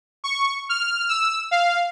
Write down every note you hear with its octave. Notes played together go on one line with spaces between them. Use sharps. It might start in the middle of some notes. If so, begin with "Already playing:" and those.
C#6
F6
E6
F5